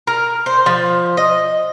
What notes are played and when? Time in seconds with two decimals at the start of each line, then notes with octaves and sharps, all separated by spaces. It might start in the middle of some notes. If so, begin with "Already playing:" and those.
0.07 A#4
0.46 C5
0.66 F3
1.17 D#5